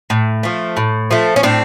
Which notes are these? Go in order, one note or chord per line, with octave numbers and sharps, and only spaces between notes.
A2
F3 A3
A2
F3 A3
C#4
A2 C4 D4